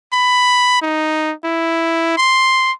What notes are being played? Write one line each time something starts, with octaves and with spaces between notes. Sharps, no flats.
B5
D#4
E4
C6